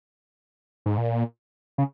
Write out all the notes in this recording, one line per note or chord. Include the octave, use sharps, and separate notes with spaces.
G#2
A#2
C#3